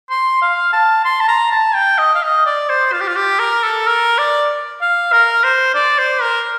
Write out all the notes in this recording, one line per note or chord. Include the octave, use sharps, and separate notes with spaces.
C6
F5
A5
C6
A5
A#5
A5
G5
D#5
F5
D#5
D5
C5
F4
G4
F4
G4
A#4
A4
A#4
D5
F5
A#4
C5
D5
C5
A#4